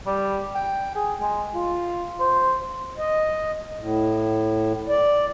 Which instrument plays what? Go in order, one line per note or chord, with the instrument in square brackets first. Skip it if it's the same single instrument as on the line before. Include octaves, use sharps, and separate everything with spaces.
[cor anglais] G3
G5
G#4
G#3
F4
C5
[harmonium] D#5
A2
D5